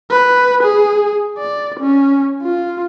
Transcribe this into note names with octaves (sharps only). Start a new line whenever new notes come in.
B4
G#4
D5
C#4
F4